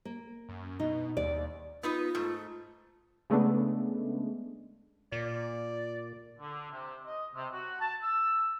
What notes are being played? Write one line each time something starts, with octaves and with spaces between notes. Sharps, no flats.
A#3
F#2
B2 D#4
D#2 D5
B3 D#4 F4 B4
G#2 A3
C#3 G#3 A3 B3 D4
A#2 D5
D3
C3
D#5
C3
F#4
A5
E6